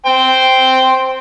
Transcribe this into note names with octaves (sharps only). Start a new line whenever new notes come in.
C5 G5